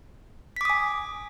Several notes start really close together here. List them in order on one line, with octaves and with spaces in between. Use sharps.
B6 D6 D#6 G#5